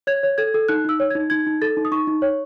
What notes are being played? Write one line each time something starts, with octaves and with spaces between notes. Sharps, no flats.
C#5 G#6
C#5
A4 G#6
A4
D#4 F#6
D#4 E6
C#5
D#4 G#6
D#4 G#6
D#4
A4 A6
D#4
D#6
D#4 C#6
D#4
C#5